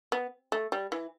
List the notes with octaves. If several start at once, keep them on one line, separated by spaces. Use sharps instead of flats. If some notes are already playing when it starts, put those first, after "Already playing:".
B3
A3
G3
E3